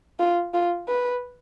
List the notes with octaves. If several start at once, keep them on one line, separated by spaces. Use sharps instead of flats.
F4
F4
B4